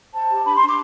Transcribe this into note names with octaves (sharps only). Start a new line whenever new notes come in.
C5 A5
G4
D4 B5
C6
D4
D6